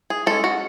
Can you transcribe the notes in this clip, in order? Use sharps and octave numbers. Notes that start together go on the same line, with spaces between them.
G#4
G#3 C#4 A4
F#4